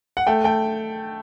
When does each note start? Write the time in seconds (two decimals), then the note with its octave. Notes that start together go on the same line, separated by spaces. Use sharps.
0.17 F#5
0.27 A3 G5
0.44 A3 G5